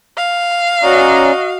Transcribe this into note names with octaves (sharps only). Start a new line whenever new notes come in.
F5
C#4 F#4 D5 D#5 A#5